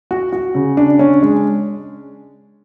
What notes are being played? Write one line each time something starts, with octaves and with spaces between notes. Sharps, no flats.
F#4
F#4
C#3
D4
C#4
G#3